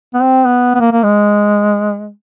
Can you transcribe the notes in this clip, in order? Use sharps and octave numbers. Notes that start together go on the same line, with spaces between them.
B3
C4
B3
B3
A#3
A#3
G#3